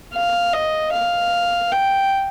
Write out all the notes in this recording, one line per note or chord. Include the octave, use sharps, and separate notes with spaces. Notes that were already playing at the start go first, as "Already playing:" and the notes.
F5
D#5
F5
G5